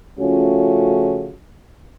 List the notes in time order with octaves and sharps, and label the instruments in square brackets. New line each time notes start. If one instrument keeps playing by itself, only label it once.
[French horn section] C#3 F3 A3 C#4 F4 F#4